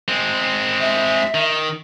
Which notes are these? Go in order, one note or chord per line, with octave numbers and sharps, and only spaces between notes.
G#3 C4
E5
D#3